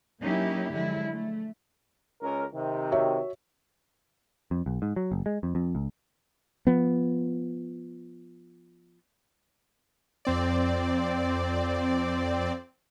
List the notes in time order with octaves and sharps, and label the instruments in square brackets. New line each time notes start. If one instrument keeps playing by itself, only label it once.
[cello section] F#3 A#3 C#4 D#4 E4 G4
D3 F3 F#3 G#3 E4
A3
[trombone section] C#2 C#4 A#4
C3 D#3
[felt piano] F#4 C#5 E5
[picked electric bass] F2
B1
G#2
F#3
F#1
G#3
F2
F2
C#2
[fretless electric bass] F3 B3
[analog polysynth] F2 C4 D5